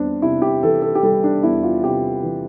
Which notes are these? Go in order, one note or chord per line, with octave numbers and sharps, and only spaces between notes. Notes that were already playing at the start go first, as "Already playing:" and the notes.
Already playing: E2 G3 C4 D4
C3 E4
G4
E3 A4
A4
G4
G3 A4
D4
E2 E4
F4
C3 G4
E3